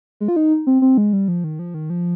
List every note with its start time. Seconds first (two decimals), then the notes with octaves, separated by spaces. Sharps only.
0.21 G#3
0.28 F4
0.36 D#4
0.67 C4
0.82 C4
0.98 G#3
1.13 G3
1.28 F3
1.44 D#3
1.59 F3
1.74 D#3
1.90 F3